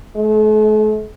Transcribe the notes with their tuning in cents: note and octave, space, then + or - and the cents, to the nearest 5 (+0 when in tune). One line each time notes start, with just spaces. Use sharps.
A3 -45